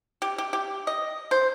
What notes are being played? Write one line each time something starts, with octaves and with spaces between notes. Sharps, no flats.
G4
G4
G4
D#5
C5